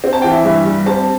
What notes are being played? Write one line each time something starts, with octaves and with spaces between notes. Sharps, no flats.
C4
A5
E3 G5
E5
G2 E5
G3
C4 A5